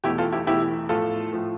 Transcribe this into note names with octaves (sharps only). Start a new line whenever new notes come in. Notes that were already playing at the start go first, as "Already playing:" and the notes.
E2 B2 A3 E4 G4
F4 A4
E4 G4
E2 B2 A3 E4 G4
A2 F3 A3 F4 A4
A2 F3 A3